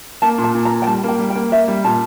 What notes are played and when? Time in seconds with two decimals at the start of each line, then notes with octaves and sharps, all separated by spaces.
0.22 A#3 A5
0.38 A#2
0.44 A5
0.55 A#2
0.65 A#5
0.71 A#2
0.82 G5
0.87 G3 A5
1.04 A#3 G5
1.19 G3
1.30 G5
1.36 A#3
1.52 A#3 E5
1.68 G3
1.84 A#2 A5